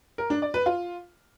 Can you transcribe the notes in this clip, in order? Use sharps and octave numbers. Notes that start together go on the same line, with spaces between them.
A#4
D4
D5
B4
F4